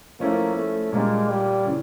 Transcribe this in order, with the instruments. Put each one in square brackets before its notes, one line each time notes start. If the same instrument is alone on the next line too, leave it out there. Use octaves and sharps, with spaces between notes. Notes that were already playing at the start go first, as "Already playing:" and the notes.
[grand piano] F3 A3 C#4 E4 [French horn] A#3
[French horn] A3
[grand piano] A#2 G3 A#3 D4 [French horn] G#3
[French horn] G3
[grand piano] C#3 E3